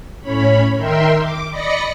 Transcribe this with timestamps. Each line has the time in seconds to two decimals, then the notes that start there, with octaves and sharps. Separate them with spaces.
0.21 A2 C#4 C#5 B5
0.76 D#3 A#4 E5 G5 C6
1.19 D6
1.50 D5 D#5 B5 A#6 C#7